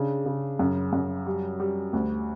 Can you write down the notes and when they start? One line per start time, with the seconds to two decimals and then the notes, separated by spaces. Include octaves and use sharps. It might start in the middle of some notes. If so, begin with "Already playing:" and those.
Already playing: C#3 D4
0.26 C#3
0.59 F#2
0.93 F#2
1.26 G3
1.60 G3
1.93 D2